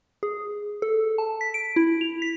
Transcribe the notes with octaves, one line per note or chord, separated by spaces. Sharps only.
G#4
A4
A5
B6
D7
E4
F7
B6